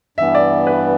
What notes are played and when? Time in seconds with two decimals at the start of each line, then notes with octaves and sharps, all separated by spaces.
0.18 G2 E3 B3 E5
0.35 D5
0.67 B4